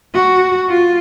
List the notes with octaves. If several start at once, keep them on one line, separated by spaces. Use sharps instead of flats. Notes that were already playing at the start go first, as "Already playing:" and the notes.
F#4
F4